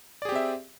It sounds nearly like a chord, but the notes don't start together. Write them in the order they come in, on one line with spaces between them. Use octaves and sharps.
D5 G#4 G4 C4 E5